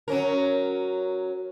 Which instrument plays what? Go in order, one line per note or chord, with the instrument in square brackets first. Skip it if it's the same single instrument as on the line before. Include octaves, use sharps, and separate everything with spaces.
[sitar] F#3 C#4 A#4